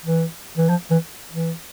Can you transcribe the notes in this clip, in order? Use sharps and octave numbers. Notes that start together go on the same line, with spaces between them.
E3
E3
F3
E3
E3